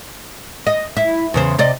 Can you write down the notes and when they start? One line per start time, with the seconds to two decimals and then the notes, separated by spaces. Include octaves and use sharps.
0.67 D#5
0.97 E4
1.34 E2 C#3 C5
1.58 C3 D5 D#5